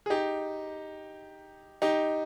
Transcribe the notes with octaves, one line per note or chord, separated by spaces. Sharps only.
G#4
D#4 G4
D#4 G4